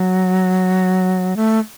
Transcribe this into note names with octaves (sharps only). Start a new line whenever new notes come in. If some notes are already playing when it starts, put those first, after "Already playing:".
Already playing: F#3
A3